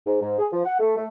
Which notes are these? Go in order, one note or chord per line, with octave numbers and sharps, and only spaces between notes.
G#2
G#2
G#4
F3
F#5
A3
A3